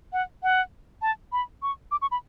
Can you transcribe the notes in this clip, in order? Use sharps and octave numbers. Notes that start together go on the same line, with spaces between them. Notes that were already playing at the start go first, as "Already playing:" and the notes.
F#5
F#5
A5
B5
C#6
D6
C#6
B5